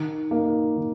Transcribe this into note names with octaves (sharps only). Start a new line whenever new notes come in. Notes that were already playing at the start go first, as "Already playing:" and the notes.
Already playing: D#3
A#3 D#4
D#3